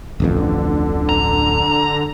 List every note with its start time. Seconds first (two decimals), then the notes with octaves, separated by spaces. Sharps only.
0.20 D1 A1 F2 D3
1.09 A#5